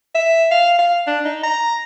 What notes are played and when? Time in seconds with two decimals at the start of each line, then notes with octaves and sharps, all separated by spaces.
0.15 E5
0.51 F5
0.79 F5
1.07 D4
1.25 D#4
1.43 A#5